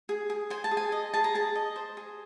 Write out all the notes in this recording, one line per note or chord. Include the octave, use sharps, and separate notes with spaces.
G#4
G#4
C5 G#5
A5
G#4
G#5
D#5
G#4 A5
A#5
G#4 A5
D#5
C5
G#4